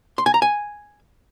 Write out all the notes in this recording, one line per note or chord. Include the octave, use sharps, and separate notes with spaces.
C6
G#5
A#5
G#5